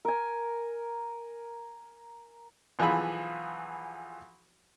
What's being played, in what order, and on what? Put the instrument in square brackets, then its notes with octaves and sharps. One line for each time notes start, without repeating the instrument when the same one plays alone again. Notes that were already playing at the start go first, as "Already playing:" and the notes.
[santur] A#4 G#5
[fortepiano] B1 E3 F3 F4 G#4 B5